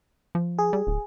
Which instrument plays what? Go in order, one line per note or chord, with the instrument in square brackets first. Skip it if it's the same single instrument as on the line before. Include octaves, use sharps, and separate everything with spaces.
[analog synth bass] F3
[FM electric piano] G#4
[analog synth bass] G3
D1